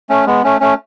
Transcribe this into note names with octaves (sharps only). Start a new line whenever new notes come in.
A3 C#4
G#3 B3
A3 C#4
A3 C#4